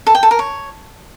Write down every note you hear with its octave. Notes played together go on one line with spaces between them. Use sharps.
A4
G5
A4
A#4
C#5